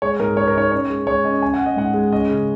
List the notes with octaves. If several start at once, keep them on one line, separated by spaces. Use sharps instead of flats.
G#3 C#5
G#2 A#4
G#2 C#5
A#4
D#4 C#5
C#4 C#5
G#3
G#3 C#5
C#4 D#5
C#4 G#5
F#5
C#4
D#5
G#2 F#5
G#3
C#4 D#5
C#3